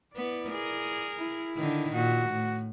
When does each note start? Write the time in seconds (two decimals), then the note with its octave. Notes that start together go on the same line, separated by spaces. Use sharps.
0.16 B3 E4 D5
0.49 G#4 A#4
1.18 E4
1.57 D3 D#3
1.94 A#2 F#4
2.30 A2